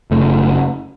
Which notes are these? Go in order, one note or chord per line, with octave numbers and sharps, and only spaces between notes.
F#1 F#2 C#3 A3